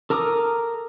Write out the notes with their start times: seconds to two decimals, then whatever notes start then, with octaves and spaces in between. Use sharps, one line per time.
0.10 A4 A#4 A#5 D6 D#6